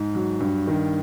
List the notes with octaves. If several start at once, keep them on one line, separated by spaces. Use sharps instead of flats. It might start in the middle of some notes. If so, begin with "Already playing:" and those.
Already playing: G#2
F#3
G2
D#3